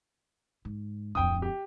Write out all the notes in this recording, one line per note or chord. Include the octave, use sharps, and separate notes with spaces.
G#2
D1 F2 G5 D#6
G4